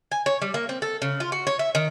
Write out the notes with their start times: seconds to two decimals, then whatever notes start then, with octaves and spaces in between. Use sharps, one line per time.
0.12 G#5
0.26 C#5
0.42 G3
0.54 A#3
0.69 C4
0.82 A4
1.02 C#3
1.20 F4
1.32 F#4
1.47 C#5
1.59 E5
1.75 D#3